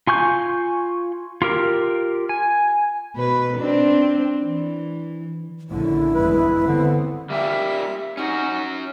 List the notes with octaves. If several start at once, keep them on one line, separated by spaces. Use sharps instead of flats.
F4 G#5 C#6 G6
F4 G4 A#4
G#5
B2 B4
C4 D4
E3
A#1 D3 C#4 E4
E2 G2 G#3 B4
D3 B3 C4
G3 A#3 G4 E5
C#4 D#4 F#4